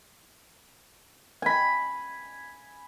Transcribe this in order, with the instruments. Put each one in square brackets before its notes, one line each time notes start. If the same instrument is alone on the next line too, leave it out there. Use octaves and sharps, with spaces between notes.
[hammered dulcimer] G#5 B5